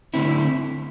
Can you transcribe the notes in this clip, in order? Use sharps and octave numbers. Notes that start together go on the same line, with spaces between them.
D3 A3 C4 E4